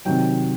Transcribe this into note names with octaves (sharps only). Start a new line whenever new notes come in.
C3 D#3 F#3 G5